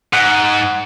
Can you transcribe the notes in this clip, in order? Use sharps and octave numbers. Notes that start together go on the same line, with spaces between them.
G#2 F#5